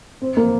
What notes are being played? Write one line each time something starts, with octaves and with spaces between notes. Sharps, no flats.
C4
A#3